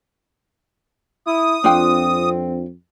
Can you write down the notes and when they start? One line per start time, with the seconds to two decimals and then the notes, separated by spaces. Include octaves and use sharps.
1.27 E4 D#6
1.64 F2 C4 D4 F4 G5